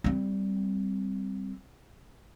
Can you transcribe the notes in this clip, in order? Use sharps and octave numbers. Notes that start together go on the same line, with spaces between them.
G3 C4